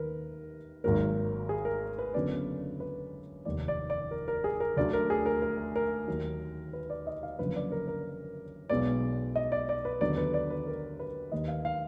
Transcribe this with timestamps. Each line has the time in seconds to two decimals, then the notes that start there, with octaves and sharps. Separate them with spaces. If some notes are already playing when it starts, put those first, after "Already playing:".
Already playing: D#2 D#3 A#3 A#4 B4
0.84 G#1 G#2 F#3 A#3 A#4
1.49 G#4
1.65 A#4
1.99 B4
2.14 F#1 F#2 D3 F#3 B3 D5
2.80 B4
3.45 F1 D#2 D#3 D5
3.68 D5
3.90 D5
4.11 A#4
4.28 A#4
4.44 G#4
4.60 A#4
4.77 D2 D3 F#3 D5
4.93 A#4
5.10 G#4
5.26 A#4
5.42 A#4
5.76 A#4
6.08 D#2 D#3 F#3
6.73 B4
6.90 D5
7.07 D#5
7.23 F5
7.39 F#1 F#2 D3 F3 B4
7.56 D5
7.72 A#4
7.88 A#4
8.69 B1 B2 G#3 B3 D5
9.36 D#5
9.52 D5
9.69 D5
9.85 B4
10.01 D#2 D3 F#3 B3 D5
10.17 B4
10.34 D5
10.50 B4
10.67 A#4
10.99 B4
11.32 D#2 D#3 A#3 D#5
11.48 F5
11.65 F5